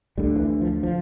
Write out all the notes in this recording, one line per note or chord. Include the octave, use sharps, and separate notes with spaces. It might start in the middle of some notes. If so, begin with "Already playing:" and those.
D2 D3 G3
F3
E3
F3
F3